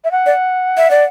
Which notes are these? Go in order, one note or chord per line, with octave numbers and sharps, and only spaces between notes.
E5
F#5
D5
E5
D5